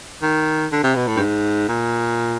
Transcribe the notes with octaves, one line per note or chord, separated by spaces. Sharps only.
D#3
D3
C3
B2
A2
G2
G#2
A#2